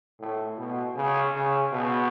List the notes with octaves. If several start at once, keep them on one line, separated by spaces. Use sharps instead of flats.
A2
B2
C#3
C#3
B2